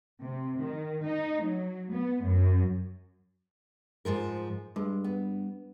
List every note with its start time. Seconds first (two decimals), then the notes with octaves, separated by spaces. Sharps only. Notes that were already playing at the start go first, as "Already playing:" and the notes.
0.22 C3
0.60 D#3
1.05 D#4
1.43 F#3
1.92 B3
2.23 F#2
4.05 G#2 F3 A#4
4.76 G2 G#3
5.04 B3